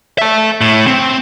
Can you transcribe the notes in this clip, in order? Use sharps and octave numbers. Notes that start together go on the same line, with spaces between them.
E5 A5
A2
C4